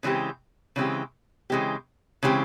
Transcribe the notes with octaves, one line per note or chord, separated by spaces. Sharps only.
C#3 E3 G#3 C4 G4
C#3 E3 G#3 C4 G4
C#3 E3 G#3 C4 G4
C#3 E3 G#3 C4 G4